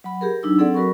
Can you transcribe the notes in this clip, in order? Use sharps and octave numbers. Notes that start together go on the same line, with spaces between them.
F#3 F#5 B5
G4 G#4 A#4
F#3 D4 D#4 E6
F#3 C4 G#4 A4 D5 F#5
F#3 F#4 A#4 B5 C#6